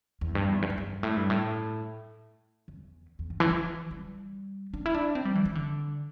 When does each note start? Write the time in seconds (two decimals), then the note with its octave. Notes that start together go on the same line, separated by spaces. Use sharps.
0.21 E2
0.35 G2
0.49 E2
0.62 G2
0.70 E2
0.78 G2
1.03 A2
1.17 G2
1.30 A2
2.68 E2
3.19 E2
3.30 G2
3.40 E3
3.50 E3
3.91 G3
4.74 D4
4.86 E4
4.94 D4
5.15 C4
5.25 G3
5.35 E3
5.46 E3
5.55 D3